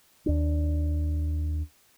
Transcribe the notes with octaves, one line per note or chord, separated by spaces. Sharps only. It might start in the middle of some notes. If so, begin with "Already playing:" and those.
D#2 D4